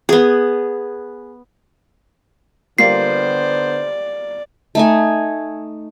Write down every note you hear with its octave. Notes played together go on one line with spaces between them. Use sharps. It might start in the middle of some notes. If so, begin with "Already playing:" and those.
B3 G#4
D3 G3 A#3 B3 F4 C5 D5 C7
A3 D#4 G#5